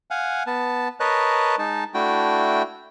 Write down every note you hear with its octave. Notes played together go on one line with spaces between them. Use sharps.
F5 F#5 G#5
B3 A5
A#4 B4 C#5 D#5 A5 F#6
G#3 D#4 A5
A3 D4 E4 F#4 G5